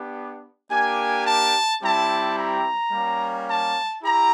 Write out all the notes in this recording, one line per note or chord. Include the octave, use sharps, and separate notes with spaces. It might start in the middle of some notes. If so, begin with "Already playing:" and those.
Already playing: B3 D4 G4
A#3 D4 G4 G#5
A5
G3 C4 E4 G4 A5
A#5
G3 A#3 C#4
A5
E4 G4 A#5